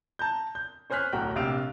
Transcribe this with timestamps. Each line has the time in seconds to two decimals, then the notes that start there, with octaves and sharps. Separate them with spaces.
0.19 A5 A#5 G6
0.55 G6
0.90 C#4 C5 G#5 F6 F#6 B6
1.12 D1 B1 F#4 G5 A#5 F#6
1.36 A#1 C3 G4 F5 E6 D7